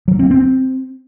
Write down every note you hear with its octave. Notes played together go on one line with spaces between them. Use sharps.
F#3
C4
C4